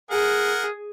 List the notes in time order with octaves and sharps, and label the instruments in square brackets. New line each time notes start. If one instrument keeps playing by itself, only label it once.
[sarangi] G#4 [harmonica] A#4 F#5